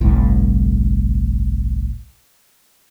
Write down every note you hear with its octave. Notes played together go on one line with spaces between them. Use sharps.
G1 C2 A2